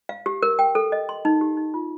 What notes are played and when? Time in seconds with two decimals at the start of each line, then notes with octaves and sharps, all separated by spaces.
0.09 F5
0.26 G4
0.43 A#4
0.59 G5
0.75 A4
0.92 D#5
1.09 C6
1.25 D#4
1.41 G4
1.57 D#4
1.74 F4